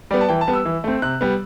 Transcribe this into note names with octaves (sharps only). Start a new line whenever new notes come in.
G3 B3 D5
A5
E3 G5
A5
G3 B3
E6
E3
A3 C4
C3 F#6
G3 B3